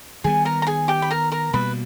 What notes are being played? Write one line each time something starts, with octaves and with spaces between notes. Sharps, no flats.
D#3 G3 B3 G#4 G#5
A#4 A#5
A#5
G#4 G#5
G4 G5
B5
A#4 A#5
A#4 A#5
B2 G3 A#3 B4 B5